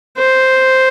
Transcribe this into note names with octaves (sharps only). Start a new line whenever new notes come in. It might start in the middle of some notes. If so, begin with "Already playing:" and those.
C5